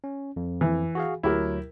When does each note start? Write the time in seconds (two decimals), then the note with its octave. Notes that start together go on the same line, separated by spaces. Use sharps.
0.04 C#4
0.36 F2
0.61 E3
0.95 F#4 G#4 F5
1.23 D2 F#3 E4 G4 A#4